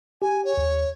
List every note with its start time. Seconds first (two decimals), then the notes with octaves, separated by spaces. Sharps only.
0.22 G4 G#5
0.45 C#5
0.57 D#2